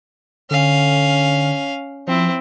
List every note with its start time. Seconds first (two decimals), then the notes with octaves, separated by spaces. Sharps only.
0.51 D3 C#4 F5
2.07 F3 C4 E4